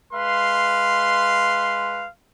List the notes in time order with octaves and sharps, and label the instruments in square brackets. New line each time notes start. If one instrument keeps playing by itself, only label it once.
[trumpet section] G#3 B4 F5 C6